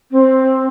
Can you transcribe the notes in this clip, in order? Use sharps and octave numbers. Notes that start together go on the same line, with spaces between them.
C4